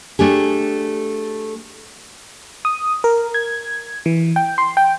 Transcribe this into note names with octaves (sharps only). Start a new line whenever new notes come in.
A3 D4 G4 G#4
D#6
A#4
G#6
E3
G5
C6
G5